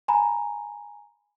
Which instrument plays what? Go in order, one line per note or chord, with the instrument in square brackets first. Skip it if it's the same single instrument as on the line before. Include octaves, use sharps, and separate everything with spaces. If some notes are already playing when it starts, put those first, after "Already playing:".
[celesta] G#5 A#5 B5